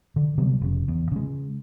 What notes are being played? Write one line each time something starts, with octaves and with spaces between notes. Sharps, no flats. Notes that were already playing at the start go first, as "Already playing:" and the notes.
D3
C3 F#3 G3 B3
F1 C#3
E2
C#3 G#3